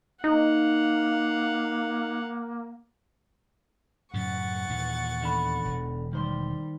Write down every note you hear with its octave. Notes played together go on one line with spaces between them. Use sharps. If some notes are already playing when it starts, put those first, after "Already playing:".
A#3 D#4 F5 F#5
F#2 A2 C#3 F#5 C#6 A6
D#2 A#2 E3
E2 D3 B5
E1
D#3 G3 C5 C6